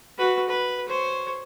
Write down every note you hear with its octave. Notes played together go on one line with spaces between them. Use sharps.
F#4 B4
B4
C5 C#5